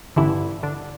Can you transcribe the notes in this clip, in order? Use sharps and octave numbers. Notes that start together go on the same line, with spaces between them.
A1 G2 D3 E3 E4
D3 D4